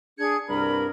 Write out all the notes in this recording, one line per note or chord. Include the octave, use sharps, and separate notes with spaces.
D4 G#4 G#6 C#7
C2 G2 D4 A#4 B5